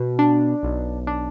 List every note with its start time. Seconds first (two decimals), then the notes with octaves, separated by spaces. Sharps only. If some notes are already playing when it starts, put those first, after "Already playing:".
Already playing: B2
0.19 D4
0.63 B1
1.07 D4